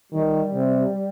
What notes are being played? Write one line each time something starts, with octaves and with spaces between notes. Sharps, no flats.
D#3 G3
C3